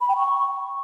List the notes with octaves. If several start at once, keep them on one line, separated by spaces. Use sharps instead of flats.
B5
G5
C#6